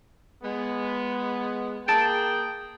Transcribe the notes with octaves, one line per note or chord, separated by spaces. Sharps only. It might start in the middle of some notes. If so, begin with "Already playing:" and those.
G#3 B3
A#3 G#4 G5 A5 A6 D7